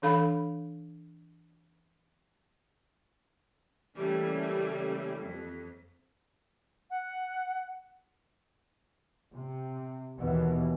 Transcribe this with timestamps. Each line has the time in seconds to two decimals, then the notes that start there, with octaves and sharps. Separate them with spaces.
0.02 E3 D4 A4 F5 B5
3.97 C#3 E3 G3 A3 A#3
5.19 F2
6.90 F#5
9.32 C3
10.18 D#2 B2 E3